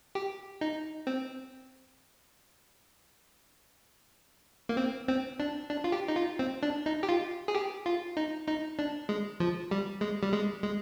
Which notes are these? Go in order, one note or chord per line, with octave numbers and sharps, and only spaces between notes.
G4
D#4
C4
A#3
C4
C4
D4
D4
F4
G4
D#4
F4
C4
D4
D#4
G4
F4
G#4
G4
F4
D#4
D#4
D4
G#3
F3
G3
G#3
G3
G#3
G#3